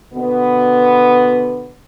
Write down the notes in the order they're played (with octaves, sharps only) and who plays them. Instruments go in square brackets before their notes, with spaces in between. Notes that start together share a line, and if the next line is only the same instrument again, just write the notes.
[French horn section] B2 D3 B3